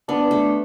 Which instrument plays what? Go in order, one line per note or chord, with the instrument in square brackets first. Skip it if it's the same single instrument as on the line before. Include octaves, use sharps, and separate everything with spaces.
[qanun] B3 [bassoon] D4
[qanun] A3